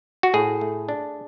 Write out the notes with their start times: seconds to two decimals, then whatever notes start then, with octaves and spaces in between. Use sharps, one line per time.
0.23 F#4
0.34 A2 G#4
0.61 A3
0.89 D4